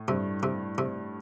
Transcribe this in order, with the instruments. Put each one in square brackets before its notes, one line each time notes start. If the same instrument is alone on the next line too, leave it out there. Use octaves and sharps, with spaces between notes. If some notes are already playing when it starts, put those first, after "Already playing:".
Already playing: [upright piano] A2
[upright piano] G2 [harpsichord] C3
[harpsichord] C3
C3